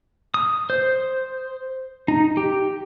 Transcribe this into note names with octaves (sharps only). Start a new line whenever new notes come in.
D#6
C5
D#4
G4